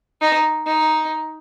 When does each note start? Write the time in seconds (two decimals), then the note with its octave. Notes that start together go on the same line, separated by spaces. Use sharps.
0.21 D#4
0.67 D#4